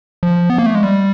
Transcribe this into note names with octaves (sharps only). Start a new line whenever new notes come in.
F3
B3
A#3
A3
G#3
G3